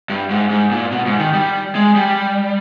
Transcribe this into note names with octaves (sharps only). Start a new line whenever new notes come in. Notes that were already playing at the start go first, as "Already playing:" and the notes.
G2
G#2
G#2
A#2
B2
G#2
D#3
G3
G#3
G3